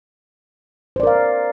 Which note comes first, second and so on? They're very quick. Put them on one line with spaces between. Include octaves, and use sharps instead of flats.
C5 D5 A#4 F5